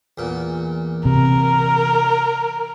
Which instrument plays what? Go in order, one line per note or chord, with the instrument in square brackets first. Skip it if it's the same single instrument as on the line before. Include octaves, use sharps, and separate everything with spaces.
[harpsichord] E2 A#2
[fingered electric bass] C3 [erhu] A#4